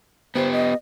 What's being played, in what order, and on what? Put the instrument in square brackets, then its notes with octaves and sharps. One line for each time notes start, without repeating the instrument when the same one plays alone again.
[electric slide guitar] B3 G4 [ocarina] C5
[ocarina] D#5